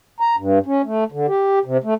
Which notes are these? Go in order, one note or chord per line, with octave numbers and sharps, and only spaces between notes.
A#5
G2
C#4
A3
D3
G4
C3
A3